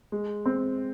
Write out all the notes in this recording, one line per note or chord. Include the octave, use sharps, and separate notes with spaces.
G#3
C4